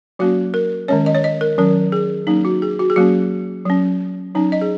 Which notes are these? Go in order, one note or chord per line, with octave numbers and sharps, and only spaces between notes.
F#3 A#3 C#4 F#4
A#4
D#3 G#3 C#4 C#5
D#5
C#5
D#5
A#4
D#3 F#3 C#4 A#4
G#4
F#3 A#3 C#4 D#4
F#4
G#4
F#4
G#4
F#3 A#3 C#4 F#4
F#3 C#4
F#3 C#4 D#4
D#5
G#4